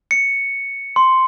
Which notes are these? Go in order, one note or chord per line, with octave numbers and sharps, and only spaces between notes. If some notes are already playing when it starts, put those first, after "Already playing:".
C#7
C6